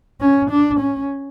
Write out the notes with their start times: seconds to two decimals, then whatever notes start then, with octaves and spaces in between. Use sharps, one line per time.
0.21 C#4
0.50 D4
0.80 C#4